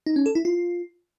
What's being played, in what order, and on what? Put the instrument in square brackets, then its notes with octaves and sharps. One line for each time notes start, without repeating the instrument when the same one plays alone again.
[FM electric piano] D#4
C#4
A4
E4
F4